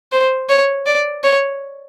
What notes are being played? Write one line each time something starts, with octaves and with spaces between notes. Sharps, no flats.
C5
C#5
D5
C#5